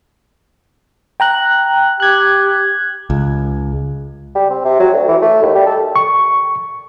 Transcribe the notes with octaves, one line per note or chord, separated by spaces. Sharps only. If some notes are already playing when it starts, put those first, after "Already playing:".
G5 A#5 F#6
G4 F#6 G#6
C#2
G3
C4
C3
F#3
D2
E3
A3
D#2
G3
A4
C#6